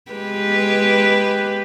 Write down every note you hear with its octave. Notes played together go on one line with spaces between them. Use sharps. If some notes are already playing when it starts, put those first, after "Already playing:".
G#3 G4 B4